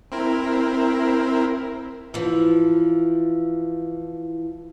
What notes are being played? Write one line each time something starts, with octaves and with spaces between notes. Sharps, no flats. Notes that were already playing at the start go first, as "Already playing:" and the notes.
C4 E4 A#4
E3 F3